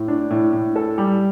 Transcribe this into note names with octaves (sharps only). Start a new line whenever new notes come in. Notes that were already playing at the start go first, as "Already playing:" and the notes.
Already playing: A2
D4
A2
A2
A4
G3